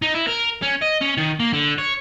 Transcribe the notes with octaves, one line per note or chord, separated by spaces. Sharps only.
D#4
E4
A#4
C#4
D#5
C#4
D#3
A#3
D3
C#5